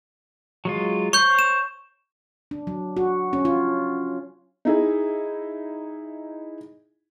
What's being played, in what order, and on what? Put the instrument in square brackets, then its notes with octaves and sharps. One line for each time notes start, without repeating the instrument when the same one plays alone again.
[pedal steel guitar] F#3 G#3 F4
[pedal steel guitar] C5 C#5 [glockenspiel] C#6 G6
[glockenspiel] E7
[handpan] D4
F#3
F#4
C#4
F4
[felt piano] D#4 E4 G#4